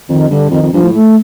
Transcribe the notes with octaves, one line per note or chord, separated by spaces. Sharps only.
F2 D#3
G2 D3
F2 D#3
F2
G2 F3
A2
A3